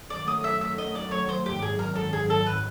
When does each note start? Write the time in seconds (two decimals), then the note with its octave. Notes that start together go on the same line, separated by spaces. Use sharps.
0.10 F#2 D#3 F#3 A3 D5
0.28 D#5
0.44 E5
0.61 E5
0.78 D#5
0.95 D5
1.11 C#5
1.29 C5
1.46 G#1 F#2 D#3 F#3 G4
1.62 G#4
1.79 A#4
1.95 A4
2.13 G#4
2.30 A4
2.46 B4